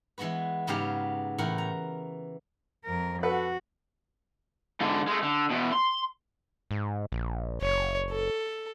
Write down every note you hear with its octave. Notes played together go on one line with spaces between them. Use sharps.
E3 G#3 B3 F#4 B4
G#2 C#3 F#3 B3 G4 F5
A2 E3 A#4 F#5
A#5
F2 A#4
F#4 A4 B4 F#5
G#2 D3
G#3 A3
D3
E2 B2
C6
G#2
A#1
F#1 C#5
A4